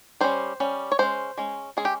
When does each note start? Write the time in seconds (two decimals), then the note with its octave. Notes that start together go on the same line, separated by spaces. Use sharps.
0.21 G3 C#4 C5
0.60 G3 C#4
0.92 C#5
0.99 G#3 C#4 C5
1.38 G#3 C#4
1.77 G#3 C#4 G#4
1.85 G4